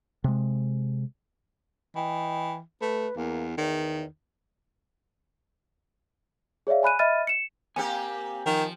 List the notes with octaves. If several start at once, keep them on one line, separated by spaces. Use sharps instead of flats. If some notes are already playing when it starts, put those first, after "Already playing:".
C3 G#3
E3 D#5 G5
A3 B4
E2 A#3
E2 D#3
G#4 C#5 D5 E5 F5
G#5 B5 F#6 D#7
D#5 E5 B5 F6 A6 D#7
C#7 E7
A#3 C4 G4 G#5
D#3 F3